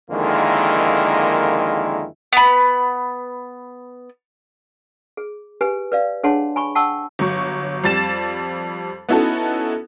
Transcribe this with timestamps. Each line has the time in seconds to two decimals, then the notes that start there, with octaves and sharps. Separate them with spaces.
0.11 F2 D3 D#3 G#3 A#3 E4
2.33 B3 B5
5.17 G#4
5.61 G4 B4 G#5
5.92 B4 D5 F5
6.23 D4 G#4 C#5 F#5 A5 C6
6.56 G#5 B5 C#6
6.75 F#5 G5 A5 C#6 E6
7.19 G1 F#3 C#6
7.84 F2 G3 A6 E7
9.09 B3 C#4 D#4 E4 F#4 A4